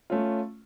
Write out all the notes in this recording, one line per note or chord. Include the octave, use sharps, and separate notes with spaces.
A3 C#4 F4